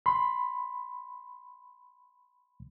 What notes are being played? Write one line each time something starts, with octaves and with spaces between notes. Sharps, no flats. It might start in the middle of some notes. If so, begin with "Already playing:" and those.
B5 C6